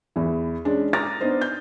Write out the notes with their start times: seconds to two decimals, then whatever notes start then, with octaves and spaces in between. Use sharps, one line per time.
0.16 E2 E3
0.65 G#3 C#4 D4
0.93 A#5 D6 D#6 F6 A6 A#6
1.21 B3 D4 D#4 C5
1.41 G6